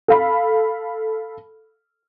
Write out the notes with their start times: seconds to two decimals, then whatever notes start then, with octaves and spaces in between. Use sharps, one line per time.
0.08 A4 F5 B5